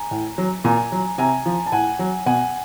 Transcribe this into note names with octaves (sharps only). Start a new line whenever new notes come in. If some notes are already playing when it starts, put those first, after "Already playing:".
Already playing: G#5 A#5
A2
F#3
A#2 G#5 A#5
F#3
C3 G#5 A#5
F3
A5
A2 F#5 G#5
F#3
B2 F#5 G#5